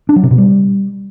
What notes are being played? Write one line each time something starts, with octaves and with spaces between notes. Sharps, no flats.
D4
F#3
C3
B2
G3